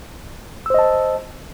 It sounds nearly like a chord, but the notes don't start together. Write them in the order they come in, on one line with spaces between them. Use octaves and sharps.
E6 C5 D#5 A5